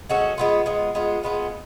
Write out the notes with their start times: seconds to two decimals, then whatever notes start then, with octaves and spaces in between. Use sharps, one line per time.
0.09 G#3 C#4 F#4 A4
0.38 G#3 B3 F4
0.66 G#3 B3 F4
0.95 G#3 B3 F4
1.23 G#3 B3 F4